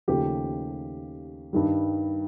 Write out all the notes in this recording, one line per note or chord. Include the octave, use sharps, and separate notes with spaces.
D#2 C#3 F3 A3 G4
G2 D#3 G3